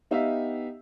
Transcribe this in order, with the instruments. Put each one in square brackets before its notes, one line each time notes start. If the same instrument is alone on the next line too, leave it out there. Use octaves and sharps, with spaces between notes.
[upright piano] B3 D#4 G4 E5 F5 G5